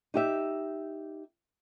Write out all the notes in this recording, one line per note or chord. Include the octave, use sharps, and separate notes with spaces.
D#4 G4 E5